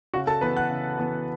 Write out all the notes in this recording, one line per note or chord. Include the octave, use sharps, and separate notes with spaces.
C#3 F#4 F#5
A4 A5
E3 B3 B4 B5
F#5 F#6
C#3
E3 B3